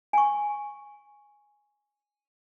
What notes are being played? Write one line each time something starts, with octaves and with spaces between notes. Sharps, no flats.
G#5 C#6